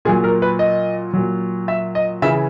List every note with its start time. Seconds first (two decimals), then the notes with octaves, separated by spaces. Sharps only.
0.05 A#2 G#4
0.08 F#3
0.24 A#4
0.42 B4
0.59 D#5
1.13 A#2 F#3
1.68 E5
1.95 D#5
2.22 C#3 E3 E5